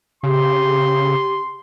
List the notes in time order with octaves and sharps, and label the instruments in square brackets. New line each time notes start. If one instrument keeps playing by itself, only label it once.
[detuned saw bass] C#3 [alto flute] G4 [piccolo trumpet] C6